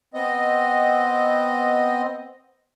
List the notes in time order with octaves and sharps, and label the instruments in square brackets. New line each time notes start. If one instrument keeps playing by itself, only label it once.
[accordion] B3 C4 D#5